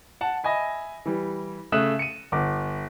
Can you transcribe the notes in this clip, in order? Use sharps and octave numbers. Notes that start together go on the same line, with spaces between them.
F#5 A5
D#5 E5 G#5 B5
E3 G3
C#3 A3 E5 D#6 F#6 E7
C#7 D#7
G1 D6